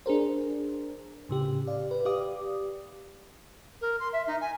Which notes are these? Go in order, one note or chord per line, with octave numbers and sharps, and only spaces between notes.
D4 G#4 A#4 C5
A2 C#3 G4
D5 F5
B4
G4 D5 F5 D6 D#6
A#4
C6
E5
D#4
G#5